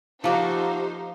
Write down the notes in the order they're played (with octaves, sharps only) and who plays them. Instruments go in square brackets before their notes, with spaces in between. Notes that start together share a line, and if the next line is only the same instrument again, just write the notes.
[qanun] F3 A4 [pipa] A3 A#3 F#4 [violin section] D#4 C5 [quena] G4